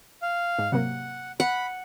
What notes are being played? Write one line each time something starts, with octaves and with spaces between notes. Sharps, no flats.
F5
G#2
C3 F#3 A#3 F#5
F#5 B5